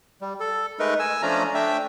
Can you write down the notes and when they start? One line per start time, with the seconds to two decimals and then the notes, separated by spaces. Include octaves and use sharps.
0.21 G3
0.40 A4
0.79 G#3 A3 D#4 A#4 B4
0.99 G#5 E6
1.22 F3 A3 C#4 D4 F4 A#5
1.55 A3 D4 E5 G5